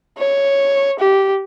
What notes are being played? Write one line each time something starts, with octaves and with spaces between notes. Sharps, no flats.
C#5
G4